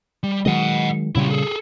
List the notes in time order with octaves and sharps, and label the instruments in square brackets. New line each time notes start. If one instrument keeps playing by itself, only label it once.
[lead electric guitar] G3
[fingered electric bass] D#3 F#3 G#3 [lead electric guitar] D#5 F#5
[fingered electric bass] A#2 C#3 G3 [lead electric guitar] E4 G4
[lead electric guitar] G#4 A4